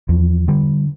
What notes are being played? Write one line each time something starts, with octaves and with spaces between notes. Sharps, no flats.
E2 F3
D3 G3